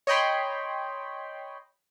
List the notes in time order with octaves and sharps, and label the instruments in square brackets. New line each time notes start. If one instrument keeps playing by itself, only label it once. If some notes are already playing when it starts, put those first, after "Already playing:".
[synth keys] C#5 D#5 G5 B5 C6